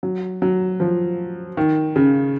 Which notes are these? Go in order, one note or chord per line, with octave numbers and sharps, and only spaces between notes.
F#3
F#3
F3
D#3
C#3